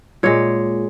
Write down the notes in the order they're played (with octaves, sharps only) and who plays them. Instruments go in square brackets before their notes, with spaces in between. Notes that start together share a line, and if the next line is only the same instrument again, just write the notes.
[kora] A#2 G#3 C#5